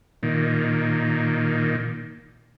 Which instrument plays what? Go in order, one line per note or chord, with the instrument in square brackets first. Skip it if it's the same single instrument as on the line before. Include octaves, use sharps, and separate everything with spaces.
[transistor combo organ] A#2 D#3